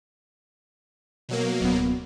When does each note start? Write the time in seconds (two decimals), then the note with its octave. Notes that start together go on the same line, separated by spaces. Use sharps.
1.29 B2 F#3 A#3
1.62 D1 B3